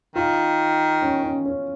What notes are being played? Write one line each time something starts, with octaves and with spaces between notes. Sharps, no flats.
D#3 F4
C#4
C#4
C#4